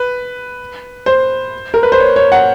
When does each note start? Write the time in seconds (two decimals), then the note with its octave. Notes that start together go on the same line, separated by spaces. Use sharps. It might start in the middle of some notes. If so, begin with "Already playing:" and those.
Already playing: B4
1.06 C5
1.74 A#4
1.83 B4
1.92 C5
2.00 C#5
2.16 C#5
2.32 F#5